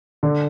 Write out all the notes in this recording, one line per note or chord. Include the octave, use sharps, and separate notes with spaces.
D3